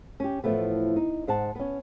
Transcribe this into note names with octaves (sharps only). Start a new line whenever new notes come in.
C#4 G4
A2 E3 F3 A3 B3
D#4
G#2 C5 F#5 A5
B3 C#4